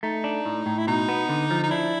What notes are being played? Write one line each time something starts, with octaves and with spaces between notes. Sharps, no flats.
A3 D#4
D4
A2
A2
E4
B2 D#4
B3
D3
F3
D#4
D4 E4